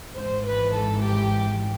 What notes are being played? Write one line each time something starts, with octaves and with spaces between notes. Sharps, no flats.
G#1 G#2 E3 C5
B4
A4
G4